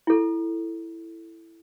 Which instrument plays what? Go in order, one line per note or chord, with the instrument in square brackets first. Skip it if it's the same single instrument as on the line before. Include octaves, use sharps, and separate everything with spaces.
[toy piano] E4 A4